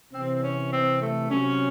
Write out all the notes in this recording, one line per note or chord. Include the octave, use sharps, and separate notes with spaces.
C3 E3 C4
C#4
C4
A3
C3 F#3 C#4